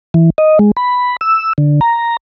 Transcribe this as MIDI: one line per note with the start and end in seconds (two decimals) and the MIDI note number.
0.14 0.30 52
0.38 0.59 75
0.59 0.71 56
0.77 1.17 83
1.21 1.53 88
1.58 1.80 50
1.81 2.17 82